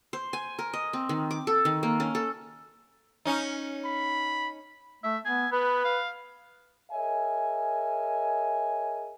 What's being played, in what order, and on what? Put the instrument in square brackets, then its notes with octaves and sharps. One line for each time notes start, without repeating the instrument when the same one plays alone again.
[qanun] C5
G#5
A#4
D#5
C4
D#3
D6
A4
D#3
A#3
C#4
A4
[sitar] C#4 D#4
[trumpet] B5
[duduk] A3 [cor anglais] E5
[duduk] B3 [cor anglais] G#5
[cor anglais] B3 [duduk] B4
[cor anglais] F5
[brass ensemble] G#4 A#4 C#5 D#5 E5 G#5